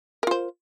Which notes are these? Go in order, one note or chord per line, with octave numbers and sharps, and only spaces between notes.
F4 A#4 C5